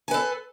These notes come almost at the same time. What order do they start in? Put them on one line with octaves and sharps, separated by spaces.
G#5 B4 A4